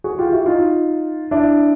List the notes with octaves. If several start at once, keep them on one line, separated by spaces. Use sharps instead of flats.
F#4 G#4
F4 G4
E4 F#4
D#4 F4
D4 E4